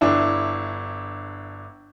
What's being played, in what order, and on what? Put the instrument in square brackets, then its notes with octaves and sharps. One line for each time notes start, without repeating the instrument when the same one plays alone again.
[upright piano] G1 D4 E4